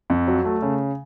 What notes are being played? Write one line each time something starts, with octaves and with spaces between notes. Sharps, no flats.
F2
F#3
A3
C#3